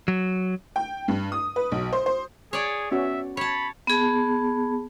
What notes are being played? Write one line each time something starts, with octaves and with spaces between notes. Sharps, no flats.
F#3
G5
G2
D#6
B4
B1
C5
C5
G#4 C#5 D5
B3 C#4 F#4 E5
C#5 A5 B5
B3 G#4 A5